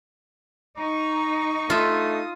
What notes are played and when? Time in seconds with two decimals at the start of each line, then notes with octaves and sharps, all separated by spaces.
0.78 D#4 A#5 C#6
1.70 A3 F4 E5 D#6